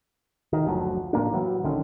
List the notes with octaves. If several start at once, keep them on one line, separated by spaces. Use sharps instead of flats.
D#3
F#1 D2 F3 F#3
A2 A#3 D4
E3 F#3 G3
A#1 D3 D#3 C#4